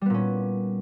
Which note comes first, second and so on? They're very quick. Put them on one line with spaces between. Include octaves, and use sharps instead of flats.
G3 B3 A#2 C#4